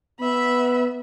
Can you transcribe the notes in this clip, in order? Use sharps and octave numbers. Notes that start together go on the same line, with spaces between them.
B3 E5 B5